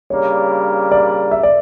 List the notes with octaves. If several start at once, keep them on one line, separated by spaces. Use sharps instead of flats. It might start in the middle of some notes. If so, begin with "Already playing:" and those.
C#3 G3 A#3 D4 C#5
D5
E5
D5